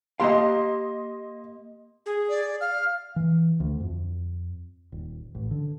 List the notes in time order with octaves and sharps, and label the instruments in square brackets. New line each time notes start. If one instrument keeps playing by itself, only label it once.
[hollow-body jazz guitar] A#3 G4 F5 [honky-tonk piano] D#5 C6
[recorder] G#4
[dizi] D5
[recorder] F5 [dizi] F6
[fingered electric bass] E3
D2
F2
D#1
A1
D3